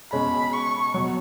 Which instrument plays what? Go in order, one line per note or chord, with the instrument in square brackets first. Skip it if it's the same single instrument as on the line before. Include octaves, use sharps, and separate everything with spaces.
[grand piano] B2 G#3 C#4 G#4 [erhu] B5
[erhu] C#6
[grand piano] B2 F#3